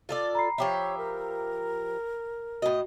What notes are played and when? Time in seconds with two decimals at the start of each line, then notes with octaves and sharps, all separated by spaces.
0.09 F4 A4 D5
0.35 A#5 B5 C7
0.58 F3 G4 C#5 E5
0.98 A#4
2.62 A2 F#4 D#5